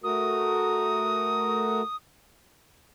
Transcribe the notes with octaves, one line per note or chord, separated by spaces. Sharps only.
A3 F#4 A#4 D#6